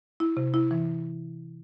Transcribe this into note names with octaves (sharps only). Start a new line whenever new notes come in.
E4
C3
E4
E3